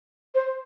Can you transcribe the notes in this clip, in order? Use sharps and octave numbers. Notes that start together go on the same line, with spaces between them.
C5